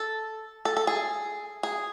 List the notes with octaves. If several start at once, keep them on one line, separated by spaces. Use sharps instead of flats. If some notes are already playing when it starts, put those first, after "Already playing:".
Already playing: A4
A4
A4
G#4
G#4